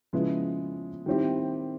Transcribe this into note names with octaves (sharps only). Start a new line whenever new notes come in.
C#3 F3 G#3 B3 E4
D#3 G3 C4 E4 G4